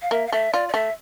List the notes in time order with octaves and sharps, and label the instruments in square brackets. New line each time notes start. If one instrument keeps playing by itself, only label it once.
[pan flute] F5
[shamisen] A#3 [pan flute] E5
[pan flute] F5
[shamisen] A3 [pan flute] E5
[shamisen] F4 [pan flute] D5
[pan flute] D5
[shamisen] A3 [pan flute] E5